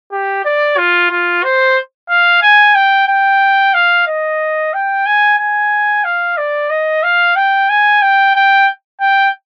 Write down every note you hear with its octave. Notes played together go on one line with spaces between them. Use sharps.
G4
D5
F4
F4
C5
F5
G#5
G5
G5
F5
D#5
G5
G#5
G#5
F5
D5
D#5
F5
G5
G#5
G5
G5
G5